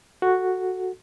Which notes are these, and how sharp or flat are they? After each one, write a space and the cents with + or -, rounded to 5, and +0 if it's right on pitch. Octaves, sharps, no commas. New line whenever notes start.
F#4 +0 A4 +0